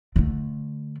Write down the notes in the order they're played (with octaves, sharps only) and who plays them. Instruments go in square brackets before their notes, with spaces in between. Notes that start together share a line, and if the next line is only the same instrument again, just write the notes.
[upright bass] D3 A3